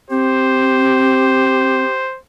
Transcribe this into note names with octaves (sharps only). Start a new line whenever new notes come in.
C4 G4 C5